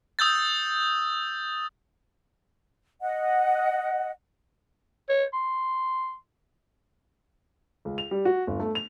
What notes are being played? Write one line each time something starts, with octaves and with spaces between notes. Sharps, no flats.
D#6 E6 G6 A6
D#5 F#5
C#5
C6
C#2
F7
G3
F#4
G1
A3
F7